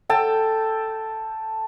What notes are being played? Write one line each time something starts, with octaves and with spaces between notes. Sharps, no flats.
A4 G5 A5